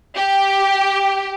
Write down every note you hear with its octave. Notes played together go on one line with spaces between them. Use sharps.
G4